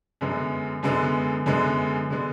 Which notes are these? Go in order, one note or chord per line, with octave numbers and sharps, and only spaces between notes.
F#2 D3 G#3 B3
F#2 D3 G#3 B3
F#2 D3 G#3 B3
D3 G#3 B3